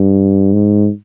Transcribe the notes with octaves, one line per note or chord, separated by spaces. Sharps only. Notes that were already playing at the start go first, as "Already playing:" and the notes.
Already playing: G2
G#2